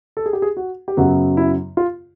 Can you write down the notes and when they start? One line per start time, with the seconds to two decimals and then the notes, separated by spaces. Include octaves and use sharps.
0.17 A4
0.26 G#4
0.33 G4
0.42 G#4
0.57 F#4
0.88 G4
0.97 F#2 C#3 F#3 B3 F#4
1.37 E4
1.77 F4